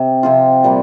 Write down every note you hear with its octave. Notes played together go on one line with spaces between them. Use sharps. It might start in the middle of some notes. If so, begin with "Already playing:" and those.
Already playing: C3
C3 F3 C4 F4
A#2 G3 A#3